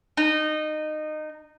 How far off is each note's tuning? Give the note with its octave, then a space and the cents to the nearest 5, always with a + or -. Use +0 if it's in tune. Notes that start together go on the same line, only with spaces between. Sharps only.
D#4 -20